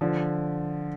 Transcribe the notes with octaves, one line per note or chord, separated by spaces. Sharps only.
D3 F3